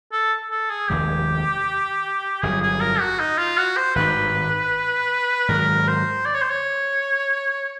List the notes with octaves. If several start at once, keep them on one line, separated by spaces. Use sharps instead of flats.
A4
A4
G#4
F1 D#2 D#3 G#3 G4
G1 F2 C#3 F#3 G#4
G#4
A#4
F#4
D#4
F4
F#4
C5
G#1 G2 D#3 B4
G#2 D#3 F#3 A#4
C5
D5
C#5
C5
C#5